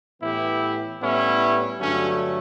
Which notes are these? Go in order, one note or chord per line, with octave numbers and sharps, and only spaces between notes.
A2 E3 B3 E4 G4
A2 G3 B3 C#4 E4
G2 D3 F#3 A3 C#4